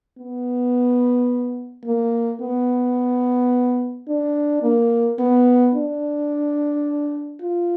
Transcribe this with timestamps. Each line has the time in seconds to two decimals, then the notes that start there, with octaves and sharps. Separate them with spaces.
0.18 B3
1.85 A#3
2.41 B3
4.08 D4
4.63 A#3
5.19 B3
5.75 D4
7.41 F4